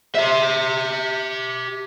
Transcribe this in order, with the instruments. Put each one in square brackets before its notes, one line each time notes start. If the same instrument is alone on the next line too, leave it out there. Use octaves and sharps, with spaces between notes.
[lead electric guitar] G4 E5